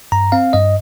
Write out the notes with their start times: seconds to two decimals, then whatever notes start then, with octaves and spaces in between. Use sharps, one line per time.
0.12 G2 A#5
0.32 C4 F5
0.53 G2 D#5